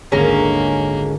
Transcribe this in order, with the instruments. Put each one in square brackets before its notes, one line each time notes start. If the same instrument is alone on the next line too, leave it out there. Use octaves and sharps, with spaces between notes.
[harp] D#1 G#1 D3 [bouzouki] G#3 C#4 A#5 [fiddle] A#3